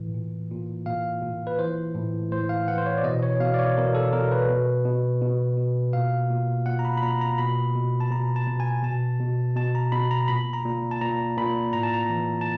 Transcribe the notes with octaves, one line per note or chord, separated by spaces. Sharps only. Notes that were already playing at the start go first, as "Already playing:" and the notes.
Already playing: A2 E3
A#2
A#2
A#2 F5
A#2
B4
E3 C5
A2
A2 C5
F5
E3 F#5
C5
C#5
D5
B2 D#5
C#5
B2 F5
D5
C#5
B2 A#4
A4
B2 A#4
B4
B2
B2
B2
B2
A#2 F5
A#2
A#2 F#5
A#5
B5
B5
A#2 A#5
A#5
B2 B5
B2
A5
B2 A#5
A5
B2
G#5
B2 A5
B2
B2 A5
A#5
B2 B5
A#5
A#2 B5
A#5
A#2
A5
A#2 A#5
A#2 B5
A2 A#5
A5
A#5
E3
A5